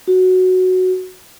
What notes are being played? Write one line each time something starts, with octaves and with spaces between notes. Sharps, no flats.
F#4